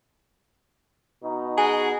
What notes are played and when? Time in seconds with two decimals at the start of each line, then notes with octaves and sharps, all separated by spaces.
1.23 B2 D#4
1.58 F#4 G#4 G#5